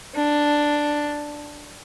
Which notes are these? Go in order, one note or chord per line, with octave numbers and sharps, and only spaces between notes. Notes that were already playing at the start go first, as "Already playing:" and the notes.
D4